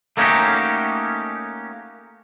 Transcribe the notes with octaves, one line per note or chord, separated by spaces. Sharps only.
A3 A#3 C#4 D#4 F#4 G4